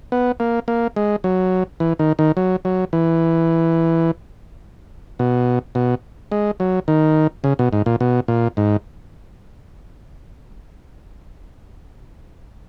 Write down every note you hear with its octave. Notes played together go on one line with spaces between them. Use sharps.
B3
A#3
A#3
G#3
F#3
E3
D#3
D#3
F#3
F#3
E3
B2
B2
G#3
F#3
D#3
C#3
B2
G#2
A#2
B2
A#2
G#2